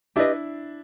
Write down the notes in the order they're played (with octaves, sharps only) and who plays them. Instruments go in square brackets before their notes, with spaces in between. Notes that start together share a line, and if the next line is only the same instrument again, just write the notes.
[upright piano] D4 E4 [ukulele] G4 B4 D#5